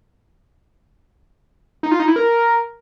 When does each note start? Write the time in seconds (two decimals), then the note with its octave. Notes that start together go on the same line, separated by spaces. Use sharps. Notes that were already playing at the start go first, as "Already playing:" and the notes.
1.83 D#4
1.91 F4
2.00 D#4
2.08 E4
2.16 A#4